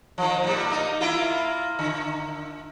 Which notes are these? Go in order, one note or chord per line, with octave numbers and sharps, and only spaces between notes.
D#3 F3
A2 G3
A#3 D#4
A#3 E4 F4
D3